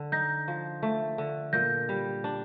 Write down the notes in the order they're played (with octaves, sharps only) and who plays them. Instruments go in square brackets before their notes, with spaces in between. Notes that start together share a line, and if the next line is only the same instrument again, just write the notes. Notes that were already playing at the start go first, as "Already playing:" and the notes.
Already playing: [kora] D3
[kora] D#4 [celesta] G6 A#6
[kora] F3
A3
D3
[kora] A#2 [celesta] G6 A#6
[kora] G3
D4